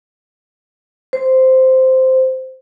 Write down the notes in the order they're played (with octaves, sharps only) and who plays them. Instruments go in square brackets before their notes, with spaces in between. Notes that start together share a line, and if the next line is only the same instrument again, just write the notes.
[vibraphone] C5